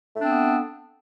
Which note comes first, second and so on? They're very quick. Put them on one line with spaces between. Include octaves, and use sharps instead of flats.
A3 D4 C4 B3